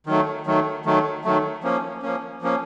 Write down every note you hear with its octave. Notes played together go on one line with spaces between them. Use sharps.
D#3 F#3 A3
D#3 F#3 A3
D#3 F#3 A3
D#3 F#3 A3
F3 A#3 C#4
F3 A#3 C#4
F3 A#3 C#4